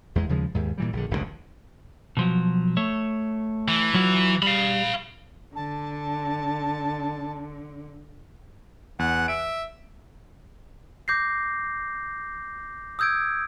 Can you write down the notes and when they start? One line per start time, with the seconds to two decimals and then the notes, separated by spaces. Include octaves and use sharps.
0.15 E2 G#3
0.29 D#2 C#3 F3 G#3
0.55 D#2 G#2
0.78 A#2 E3 G3
0.93 A#1 D3
1.11 F1 C#2 A2 D3
2.17 B2 F3 F#3
2.77 A3 C#5
3.68 E3
3.94 F#3 F4 F#4
4.42 G3 F5 B5
5.55 D3 A5
8.99 E2 F#5
9.28 E5 D7
11.08 D6 G6 A#6 C7
12.99 D#6 E6 G6 G#6 D7